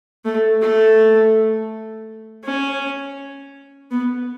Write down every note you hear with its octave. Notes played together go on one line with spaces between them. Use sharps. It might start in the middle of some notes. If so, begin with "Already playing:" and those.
A3
A3
C#4
B3